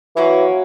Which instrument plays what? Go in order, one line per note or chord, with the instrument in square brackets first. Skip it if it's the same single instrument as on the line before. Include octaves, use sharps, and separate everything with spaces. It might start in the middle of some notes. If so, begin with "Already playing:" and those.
[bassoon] E3 [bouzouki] F#3 A#3 C#4 F#4